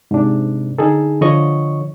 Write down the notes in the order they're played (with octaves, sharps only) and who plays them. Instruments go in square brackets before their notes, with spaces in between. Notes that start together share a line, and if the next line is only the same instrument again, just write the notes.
[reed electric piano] G#2 C3 D4
D3 D#4 G#4 A4
D3 F3 C#5 D#5 C#6